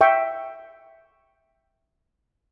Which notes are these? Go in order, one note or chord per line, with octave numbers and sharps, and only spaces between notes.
E5 G5 C#6